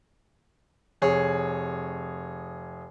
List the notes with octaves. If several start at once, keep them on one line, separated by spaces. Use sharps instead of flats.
F1 G#4 C#5